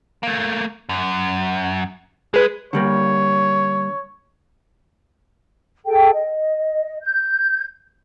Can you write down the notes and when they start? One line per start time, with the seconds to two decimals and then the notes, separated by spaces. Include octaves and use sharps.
0.23 A3 A#3
0.89 F#2
2.34 G#3 G#4 B4
2.73 D3 G3 A#3 C#5
5.86 G#4 A4 G5
6.13 D#5
7.02 G6